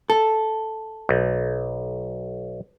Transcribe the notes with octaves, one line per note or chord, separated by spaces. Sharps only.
A4
B1